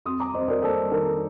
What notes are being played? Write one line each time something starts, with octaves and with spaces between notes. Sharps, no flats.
F2 C6 D#6
A#5 D6
F2 C5 D#5
A#4 D5
A#3 A4 C5
D#3 A#4